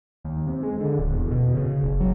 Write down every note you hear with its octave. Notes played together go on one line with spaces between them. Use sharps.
D#2
C3
G#3
D3
D1
E2
B2
C#3
F#1
F#3